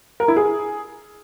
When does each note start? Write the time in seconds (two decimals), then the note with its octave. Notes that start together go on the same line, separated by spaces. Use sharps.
0.20 A#4
0.28 E4
0.36 G#4